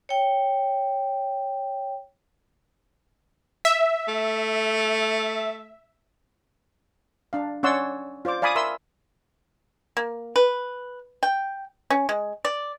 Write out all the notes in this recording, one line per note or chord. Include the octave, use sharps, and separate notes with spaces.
C#5 G5
E5
A3
D4 F5
C#4 C#5 D5 F#5 C6 E6
F4 C5 D5 D6
D5 F5 G#5 B5 D6 D#6
A#4 E5 B5 C6 E6
A#3
B4
G5
C#4
G#3
D5